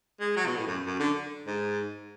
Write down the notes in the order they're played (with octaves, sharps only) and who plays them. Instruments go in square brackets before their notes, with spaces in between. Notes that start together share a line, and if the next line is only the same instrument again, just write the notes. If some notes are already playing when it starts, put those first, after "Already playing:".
[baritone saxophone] G#3
F#3
B2
A2
F#2
F#2
D3
G#2